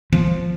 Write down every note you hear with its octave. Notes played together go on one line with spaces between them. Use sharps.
F3